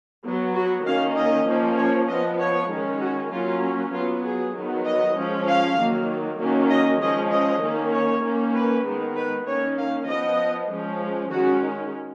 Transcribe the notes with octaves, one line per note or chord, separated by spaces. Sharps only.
F#3 B3
F#4
D#3 A#3 C#4 F5
D#5
F3 A#3 C#4
C#5
F3 B3 D#5
C#5
D#3 G#3 C#4
F#4
F#3 A#3 C#4 F4
F#3 B3 F4
G#4
D#3 F#3 B3
D#5
F3 G#3 C#4
F5
D#3 F#3 A#3
D#3 F#3 A#3 C#4
D#5
F3 G#3 C#4 D#5
D#5
D#3 A#3 C#4
C#5
D#3 A#3 C#4
B4
D#3 G#3 B3
B4
D#3 A#3 C#4 C#5
F5
F3 B3 D#5
F3 G#3 C#4
D#3 G#3 C#4 F#4